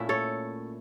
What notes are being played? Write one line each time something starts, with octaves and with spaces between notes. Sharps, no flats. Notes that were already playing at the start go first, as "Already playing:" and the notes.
Already playing: A#2 A3 C#4 E4 E5
A4 C#5